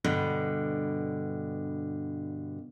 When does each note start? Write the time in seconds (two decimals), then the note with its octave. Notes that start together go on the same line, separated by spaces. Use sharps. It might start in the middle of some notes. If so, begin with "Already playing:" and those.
0.04 G2 B2 D3